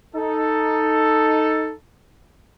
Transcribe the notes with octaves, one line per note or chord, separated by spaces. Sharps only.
D#4 A4